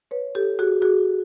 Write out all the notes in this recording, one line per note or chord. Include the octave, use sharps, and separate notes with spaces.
B4 C#5
G4 A4
F#4 G#4
F#4 G#4